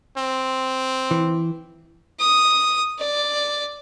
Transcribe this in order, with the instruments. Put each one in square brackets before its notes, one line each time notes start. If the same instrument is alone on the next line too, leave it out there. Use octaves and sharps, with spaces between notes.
[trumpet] C4
[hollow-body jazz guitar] E3
[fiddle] D#6
D5